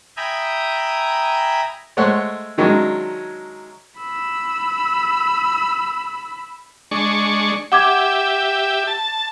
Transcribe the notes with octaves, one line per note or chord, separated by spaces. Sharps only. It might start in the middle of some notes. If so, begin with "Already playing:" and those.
E5 G5 G#5 A#5 B5 D#6
G#3 A3 C5 C#5 F#5 C6
D#3 F#3 G#3 C#4 D4 E4
B5 E6
G#3 D4 C#6
G4 E5 F#5 D6 G#6
A5